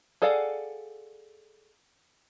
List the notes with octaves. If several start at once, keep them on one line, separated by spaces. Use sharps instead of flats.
G#4 A4 D5 F5 F#5